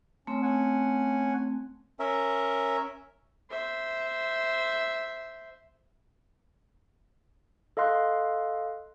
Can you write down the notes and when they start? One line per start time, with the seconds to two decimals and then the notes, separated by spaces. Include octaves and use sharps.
0.27 A3 C4 C#4
0.42 C#4 F#5 G#5
1.99 C#4 A#4 E5
3.50 C5 E5
7.77 A4 D#5 F5 C6 F#6